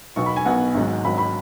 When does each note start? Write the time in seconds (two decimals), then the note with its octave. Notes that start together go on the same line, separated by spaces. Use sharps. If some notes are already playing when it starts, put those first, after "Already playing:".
0.16 B1 B2 B3 C#6
0.26 B5
0.36 G#5
0.46 B1 B2 B3 F#5
0.74 G#1 G#2 F#3
1.04 G#1 G#2 F#3 B5
1.18 B5